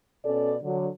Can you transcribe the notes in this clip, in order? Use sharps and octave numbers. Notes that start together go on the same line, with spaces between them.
B2 C#4 A4 D5
D3 F#3